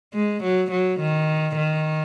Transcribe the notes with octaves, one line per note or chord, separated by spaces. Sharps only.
G#3
F#3
F#3
D#3
D#3